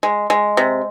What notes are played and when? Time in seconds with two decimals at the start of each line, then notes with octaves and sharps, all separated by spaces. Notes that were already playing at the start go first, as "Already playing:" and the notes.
0.03 G#3
0.30 G#3
0.57 C3